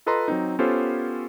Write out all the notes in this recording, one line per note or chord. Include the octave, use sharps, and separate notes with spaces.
F4 A4 B4 D#5 A#5 C6
F#3 C4 D#4
B3 C#4 F4 G4 A4 C5